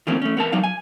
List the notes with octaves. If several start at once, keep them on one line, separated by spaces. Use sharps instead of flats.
D#3 F3 A3 A#3 C4 C#4
A3 C#4
B3 A#4 A5
F#3 D#4 F5
G#5